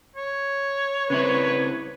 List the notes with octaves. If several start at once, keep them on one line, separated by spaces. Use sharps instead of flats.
C#5
C#3 C4 E4 B4